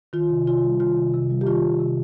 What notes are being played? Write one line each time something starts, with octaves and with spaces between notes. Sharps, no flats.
D#3 F4
C3
C3 F4
G3
D#3 F4
C3
C3
G3
G4
D#3 F4
C3
C3